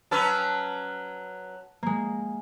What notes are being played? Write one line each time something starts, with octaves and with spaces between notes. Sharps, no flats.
F#3 C#4 B4 A5 E6 F6
G#3 A#3